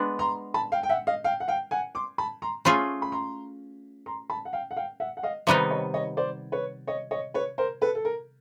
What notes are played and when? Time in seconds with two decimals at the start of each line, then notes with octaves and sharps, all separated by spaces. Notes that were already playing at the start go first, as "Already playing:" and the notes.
Already playing: G#3 B3 D4
0.19 A#5 C6
0.54 A5 B5
0.72 F5 G5
0.83 G5
0.89 E5 F#5
1.07 D#5 F5
1.24 F5 G5
1.40 F#5
1.48 F5 G5
1.71 F#5 G#5
1.95 C6 D6
2.18 A5 B5
2.42 A#5 C6
2.65 A3 C#4 F4 G#4 B5 C#6
3.02 B5
3.12 A#5 C6
4.06 A#5 C6
4.30 A5 B5
4.45 F#5
4.53 F5 G5
4.71 F#5
4.77 F5 G5
5.00 E5 F#5
5.17 F#5
5.23 D#5 F5
5.47 C3 D#3 G3 B3 D#4 D5 E5
5.71 C#5 D#5
5.94 C#5 D#5
6.17 C5 D5
6.52 B4 C#5
6.87 C#5 D#5
7.11 C#5 D#5
7.34 B4 C#5
7.58 A#4 C5
7.81 A4 B4
7.95 A4
8.05 A#4